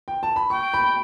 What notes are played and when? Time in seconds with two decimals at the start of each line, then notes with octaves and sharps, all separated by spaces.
0.08 G5
0.23 A5
0.36 B5
0.50 G5 C#6
0.74 B5